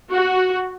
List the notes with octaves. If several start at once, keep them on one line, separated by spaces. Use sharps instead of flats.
F#4